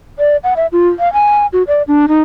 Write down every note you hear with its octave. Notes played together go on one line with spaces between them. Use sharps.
D5
F#5
E5
F4
F5
G#5
F#4
D5
D4
D#4